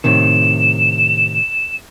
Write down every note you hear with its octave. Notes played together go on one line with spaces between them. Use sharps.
A2 C3 D#3 E7